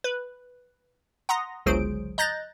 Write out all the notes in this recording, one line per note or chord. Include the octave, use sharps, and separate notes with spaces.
B4
F#5 A#5 C6 D#6 A#6
G1 C#2 F#3 G#4 C5 D7
D#5 A#5 F#6 G6 A6 A#6